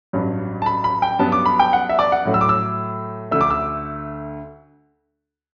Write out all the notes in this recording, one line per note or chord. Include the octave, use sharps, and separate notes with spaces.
A1 G2 F#3
A5
B5
B5
G5
G2 F#3 B3 A5
D6
B5
G5
F#5
E5
D5
F#5
A2 F#3 A3
E6
D6
E6
D2 D3 A3 E6
D6
E6